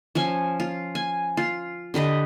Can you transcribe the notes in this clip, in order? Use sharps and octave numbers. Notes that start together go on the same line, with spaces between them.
F3 C#4 G#5
F4
G#5
F4
D3 G4 B4 D#5